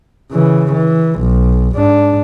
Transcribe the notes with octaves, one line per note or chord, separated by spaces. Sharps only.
C#3 E3
E3
B1
G#2 D4